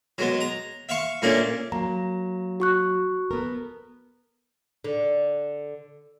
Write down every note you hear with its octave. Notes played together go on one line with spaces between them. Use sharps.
F#3 G#3 B3
A#5
E5 F5 C#6
A#2 A3 A#3 C#4 D4
F#3 A#3 A#5
F#4 C#6 F#6
B3 A4 A#4
D3